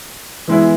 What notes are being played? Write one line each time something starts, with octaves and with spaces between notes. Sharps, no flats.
E3 G#3 B3 E4